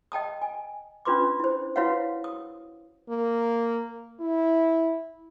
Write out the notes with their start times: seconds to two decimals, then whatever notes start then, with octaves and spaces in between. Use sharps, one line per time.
0.12 D#5 G5 A5 D#6
0.42 G#5
1.05 C#4 D4 F4 B4 C6 D6
1.40 E4 C5
1.76 E4 F#4 B4 C#5 F5 F#5
2.24 D#6
3.09 A#3
4.20 E4